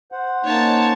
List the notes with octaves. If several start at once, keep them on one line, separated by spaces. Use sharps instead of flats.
C5 F#5
A#3 C#4 D#4 C#5 A5